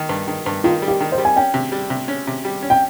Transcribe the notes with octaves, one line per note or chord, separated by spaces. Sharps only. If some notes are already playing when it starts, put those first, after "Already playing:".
Already playing: D#3
G2
D#3
G2
D#3 F4
G3
G4
D#3
C5
G3
G#5
C#4 G5
C3
G3
C3
C#4
C3
G3
C#4
G5